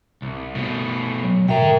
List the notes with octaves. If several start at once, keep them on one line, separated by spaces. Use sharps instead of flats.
C2
B2 A3
F#3
G#2 B2 A#4 E5 G5 A#5
D3